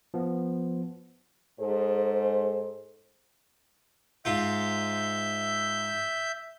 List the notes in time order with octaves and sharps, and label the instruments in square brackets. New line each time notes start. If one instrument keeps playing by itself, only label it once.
[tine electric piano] F3 B3
[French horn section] G#2 G#4 A4 C5
[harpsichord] G#2 F4 [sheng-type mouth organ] E5 G6